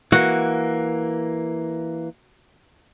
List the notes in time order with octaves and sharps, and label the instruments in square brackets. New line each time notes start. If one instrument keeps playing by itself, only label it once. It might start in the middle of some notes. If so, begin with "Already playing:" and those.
[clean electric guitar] E3 A#3 [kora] F#4 F#5